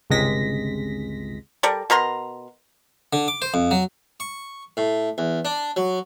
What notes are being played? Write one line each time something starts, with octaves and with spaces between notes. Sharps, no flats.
G1 C#2 C3 G#3 A#6 B6
G3 A4 A#4 D5
B2 A#4 A#5 C6
D3
D6
C5
F2
F#3
C#6
A2
E2
D4
F#3